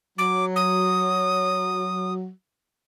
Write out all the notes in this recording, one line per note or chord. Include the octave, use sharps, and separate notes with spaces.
F#3 D6
D#6